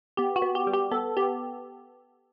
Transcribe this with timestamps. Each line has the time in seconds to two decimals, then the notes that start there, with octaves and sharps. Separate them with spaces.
0.17 B3 G4
0.36 F#4
0.42 B3
0.55 G4
0.67 G3
0.73 G4
0.91 B3 A4
1.17 B3 G4